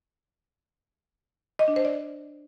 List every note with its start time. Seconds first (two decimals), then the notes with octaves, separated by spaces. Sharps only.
1.59 D#5
1.68 D4
1.76 C5
1.85 D5